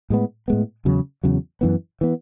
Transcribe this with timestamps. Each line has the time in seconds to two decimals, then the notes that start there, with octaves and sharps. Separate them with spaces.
0.10 A2 G#3 B3
0.48 A2 G#3 B3
0.85 E2 C#3 F#3
1.23 E2 C#3 F#3
1.61 F#2 E3 B3
2.01 E3 B3